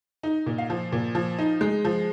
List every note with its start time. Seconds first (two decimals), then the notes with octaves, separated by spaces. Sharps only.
0.23 D#4
0.46 A#2
0.58 F5
0.70 F3
0.92 A#2
1.15 F3
1.39 D#4
1.61 G#3
1.85 F3